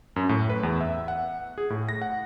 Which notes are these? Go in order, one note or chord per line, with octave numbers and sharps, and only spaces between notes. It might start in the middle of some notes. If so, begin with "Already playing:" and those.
F#2
A2
B4
E2
E5
F#5
G#4
A2
A#6
F#5